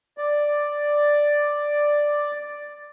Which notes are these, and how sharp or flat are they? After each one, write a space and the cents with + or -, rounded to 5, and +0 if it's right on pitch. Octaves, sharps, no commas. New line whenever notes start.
D5 +5